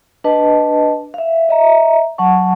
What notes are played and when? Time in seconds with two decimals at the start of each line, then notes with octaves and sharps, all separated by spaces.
0.24 D4 B4 D#5 A5
1.14 E5 F5
1.49 D#5 E5 A#5
2.18 F#3 F#5 A5 C#6